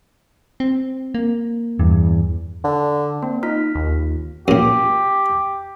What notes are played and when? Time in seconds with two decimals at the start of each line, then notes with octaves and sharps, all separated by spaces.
0.60 C4
1.14 A#3
1.79 E2 G2
2.64 D3
3.23 A#3 C4
3.43 D#4 F4 F6 B6
3.75 D#2
4.48 F#2 A#2 G4